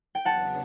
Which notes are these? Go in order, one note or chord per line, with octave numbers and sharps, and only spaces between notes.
G5
E2 C#3 F#3 B3 D4 F#5 A5